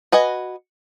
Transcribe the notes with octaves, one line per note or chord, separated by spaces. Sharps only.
F#4 B4 D#5 G#5